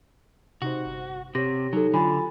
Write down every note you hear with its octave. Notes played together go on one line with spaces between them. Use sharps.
C3 D#4 F#4 C5
G1
C3 G4 C#5 A#6
F#3 D#4 A4
D3 F#3 F4 G#5 B5 A6